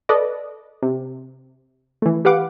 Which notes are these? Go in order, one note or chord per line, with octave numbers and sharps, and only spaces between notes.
A4 B4 D5 D#5
C3
E3 A3
G4 B4 F5 F#5 D6